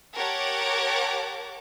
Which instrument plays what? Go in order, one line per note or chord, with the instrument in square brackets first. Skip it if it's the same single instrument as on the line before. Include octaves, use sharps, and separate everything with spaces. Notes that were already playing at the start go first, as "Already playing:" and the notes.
[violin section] G4 A#4 C#5 F#5 A5 D6